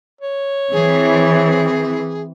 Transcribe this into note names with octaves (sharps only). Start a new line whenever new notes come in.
C#5
E3 C4 G#4